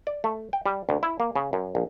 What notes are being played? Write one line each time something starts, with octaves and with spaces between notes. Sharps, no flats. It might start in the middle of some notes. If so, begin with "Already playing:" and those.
D5
A3
G5
G3
D2
E4
A#3
C#3
F#2
A#1